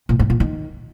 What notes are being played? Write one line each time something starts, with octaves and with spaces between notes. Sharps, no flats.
A#2
G#2
A#2
D#3